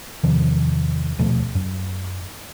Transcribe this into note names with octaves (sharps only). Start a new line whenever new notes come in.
E2 C3 D#3 F3
D#1 B2 F3 A3
F#2